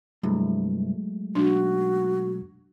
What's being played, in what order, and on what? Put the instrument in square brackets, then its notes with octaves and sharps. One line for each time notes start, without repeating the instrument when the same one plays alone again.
[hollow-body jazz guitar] C2 G2 [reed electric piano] F#3 G#3 A3
[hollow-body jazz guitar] B1 [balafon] D4 [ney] F#4